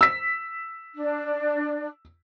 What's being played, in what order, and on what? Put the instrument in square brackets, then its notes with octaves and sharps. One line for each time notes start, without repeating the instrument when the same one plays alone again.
[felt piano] E6 B6
[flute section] D4